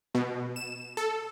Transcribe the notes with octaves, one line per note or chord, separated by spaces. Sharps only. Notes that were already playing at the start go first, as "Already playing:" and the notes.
B2
E7
A4